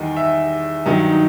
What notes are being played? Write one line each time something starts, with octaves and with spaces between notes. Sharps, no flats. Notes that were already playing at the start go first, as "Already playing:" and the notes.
Already playing: E2 D#3 G3 D#5
E5
G2 D#3 F#3 D#5
D#4